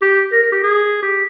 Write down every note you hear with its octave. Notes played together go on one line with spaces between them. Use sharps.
G4
A#4
A#4
G4
G#4
G4